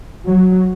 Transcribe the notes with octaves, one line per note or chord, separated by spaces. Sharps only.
F#3